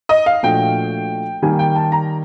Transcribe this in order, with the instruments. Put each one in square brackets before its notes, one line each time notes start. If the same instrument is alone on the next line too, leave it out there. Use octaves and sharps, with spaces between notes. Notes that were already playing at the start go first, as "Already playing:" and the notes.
[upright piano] D#5
F5
[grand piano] A#2 F3 A3 D4 F#4 [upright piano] G5
[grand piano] D#3 G3 A#3 [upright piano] G#5
[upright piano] G5
A5
A#5